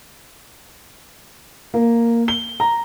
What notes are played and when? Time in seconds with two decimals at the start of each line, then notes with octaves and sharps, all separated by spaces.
1.74 A#3
2.28 G7
2.60 A#5